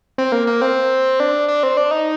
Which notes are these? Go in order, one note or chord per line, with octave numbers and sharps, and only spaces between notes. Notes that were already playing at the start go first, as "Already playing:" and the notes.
C4
A#3
A#3
C4
D4
D4
C4
D4
D#4